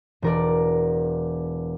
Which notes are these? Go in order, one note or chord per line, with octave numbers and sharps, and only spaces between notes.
E1 A#4 D5